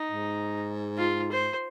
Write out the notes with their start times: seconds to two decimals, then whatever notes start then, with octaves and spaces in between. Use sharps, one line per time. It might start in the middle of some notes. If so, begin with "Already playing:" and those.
Already playing: D#4
0.11 G#2
0.98 F4
1.32 C5